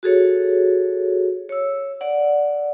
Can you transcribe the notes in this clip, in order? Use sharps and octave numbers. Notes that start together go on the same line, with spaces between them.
F#4 G#4 A4 C#5
C#5 E6
D5 F#5